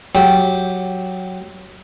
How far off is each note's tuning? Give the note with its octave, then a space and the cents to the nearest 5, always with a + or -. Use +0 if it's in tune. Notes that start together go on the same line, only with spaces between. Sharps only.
F#3 +0 G4 +0